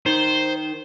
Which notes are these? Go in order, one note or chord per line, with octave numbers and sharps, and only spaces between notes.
D#3 C5